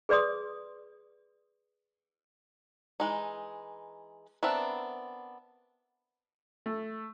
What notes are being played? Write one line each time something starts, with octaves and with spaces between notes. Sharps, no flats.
G#4 B4 D5 C6 D#6
E3 G#3 D#4
B3 C4 D4 A#4 E5
A3